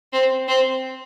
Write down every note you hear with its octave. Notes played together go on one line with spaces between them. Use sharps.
C4
C4